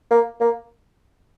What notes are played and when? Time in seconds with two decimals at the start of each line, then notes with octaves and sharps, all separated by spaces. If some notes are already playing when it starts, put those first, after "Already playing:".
0.11 A#3
0.41 A#3